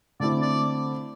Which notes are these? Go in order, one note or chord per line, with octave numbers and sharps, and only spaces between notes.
D3 A3 C4 E4 D5
D5